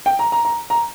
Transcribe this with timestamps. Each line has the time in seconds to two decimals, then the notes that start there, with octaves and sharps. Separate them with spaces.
0.06 G5
0.19 A#5
0.32 A#5
0.45 A#5
0.70 A#5